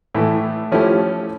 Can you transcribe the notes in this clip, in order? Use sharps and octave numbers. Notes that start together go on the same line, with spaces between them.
A2 E3 A3
F3 A3 C#4 E4 G4